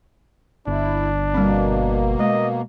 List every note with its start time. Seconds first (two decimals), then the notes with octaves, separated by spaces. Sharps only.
0.67 G1 D4 E4
1.34 B2 G3 A#3 C4
2.19 G#3 D#5